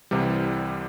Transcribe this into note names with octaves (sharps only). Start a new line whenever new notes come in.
C2 C3 E3 G3